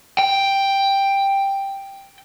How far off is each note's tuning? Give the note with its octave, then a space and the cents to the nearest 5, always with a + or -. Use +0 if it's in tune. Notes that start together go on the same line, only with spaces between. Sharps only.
G5 +5